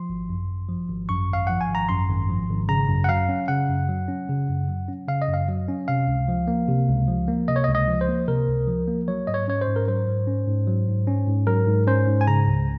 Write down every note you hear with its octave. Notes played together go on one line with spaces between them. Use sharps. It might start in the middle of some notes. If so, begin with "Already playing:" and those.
Already playing: F3 C6
G#1
F#2
G#1
F3
G#1
F#2 C#6
G#1 F5
F3 F#5
G#5
G#1
A#5
F#2 C6
G#1
F3
G#1
C#3 A#5
F#2
F#5
F#3 F5
C#4
C#3 F#5
F#2
F#3
C#4
C#3
F#2
F#3
C#4
C#3 F5
D#5
F#2
F5
F#3
C#4
C3 F5
C#2
F3
A#3
C3
C#2
F3
A#3
C3 D#5
C#5
D#5
C#2
D#5
F3
C5
A#3
C3 A#4
C#2
F3
A#3
F#3 C#5
G#2 D#5
C#5
C#4 C#5
C5
G#2
A#4
F#3 C5
G#2
C#4
G#2
F#3
G#2
C#4
G#2
F#3 A#4
G#2
C#4 C5
G#2
G#5
C#3 A#5
C#2